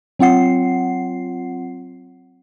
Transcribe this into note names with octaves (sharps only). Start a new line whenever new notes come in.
F#3 C4 F4 F#5 C7